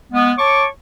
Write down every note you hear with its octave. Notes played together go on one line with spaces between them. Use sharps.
G#3 B3
C#5 A5 C#6 D6